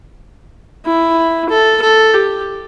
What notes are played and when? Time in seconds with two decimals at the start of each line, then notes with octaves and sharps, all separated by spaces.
0.86 E4
1.50 A4
1.82 A4
2.13 G4